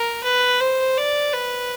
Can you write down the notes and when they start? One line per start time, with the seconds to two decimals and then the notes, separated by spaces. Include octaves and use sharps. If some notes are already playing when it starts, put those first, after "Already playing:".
Already playing: A#4
0.24 B4
0.61 C5
0.97 D5
1.33 B4